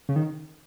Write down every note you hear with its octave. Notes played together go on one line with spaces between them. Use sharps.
C#3
D#3